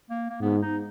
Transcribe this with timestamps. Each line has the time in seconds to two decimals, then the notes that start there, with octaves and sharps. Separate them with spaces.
0.10 A#3
0.30 A#3
0.41 G#2 B3
0.62 D#4